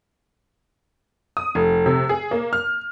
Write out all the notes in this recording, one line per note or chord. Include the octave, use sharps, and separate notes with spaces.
D#6
F1
C3
G#4
A#3
F6